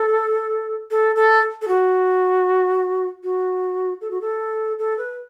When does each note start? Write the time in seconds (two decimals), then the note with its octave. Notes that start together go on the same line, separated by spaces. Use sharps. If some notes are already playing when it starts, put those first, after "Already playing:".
Already playing: A4
0.91 A4
1.16 A4
1.62 A4
1.68 F#4
3.23 F#4
4.01 A4
4.11 F#4
4.21 A4
4.79 A4
4.98 B4